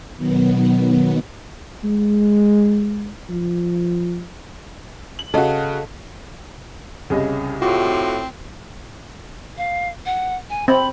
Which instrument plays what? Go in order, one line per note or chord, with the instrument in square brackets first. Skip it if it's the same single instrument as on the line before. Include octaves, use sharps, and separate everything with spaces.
[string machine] B2 D#3 F#3 B3
[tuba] G#3
F3
[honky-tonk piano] F#7
[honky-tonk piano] C#3 F#4 [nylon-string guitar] A4 D#5 F5
[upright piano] C2 D#5 [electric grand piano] C#3 G#4
[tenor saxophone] A2 [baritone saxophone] C4 [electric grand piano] F4 F#4 D6
[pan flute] F5
F#5
G#5
[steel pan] C4 [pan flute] B5